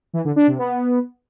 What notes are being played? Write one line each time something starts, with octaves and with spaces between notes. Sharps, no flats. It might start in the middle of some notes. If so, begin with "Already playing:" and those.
E3
D3
D4
C3
B3